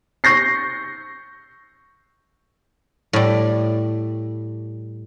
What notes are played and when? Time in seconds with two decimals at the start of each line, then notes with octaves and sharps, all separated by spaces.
0.24 C#6 G6 A#6 C7
3.13 A2 G3